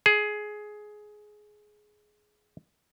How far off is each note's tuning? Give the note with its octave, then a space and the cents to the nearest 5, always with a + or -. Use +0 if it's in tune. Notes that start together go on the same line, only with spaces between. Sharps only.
G#4 +15